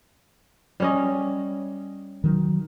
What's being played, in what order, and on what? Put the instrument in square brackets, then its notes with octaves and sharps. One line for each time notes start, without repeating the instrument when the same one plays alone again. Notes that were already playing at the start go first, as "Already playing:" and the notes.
[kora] G3 C#4 D#5
[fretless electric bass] D#3 F#3